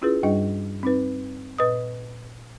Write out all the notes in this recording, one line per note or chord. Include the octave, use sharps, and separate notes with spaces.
C#4 E4 F4 G#4 B4
G2 G3 D4 G#4 D#5
C4 D#4 B4
A#2 B4 D#5 D#6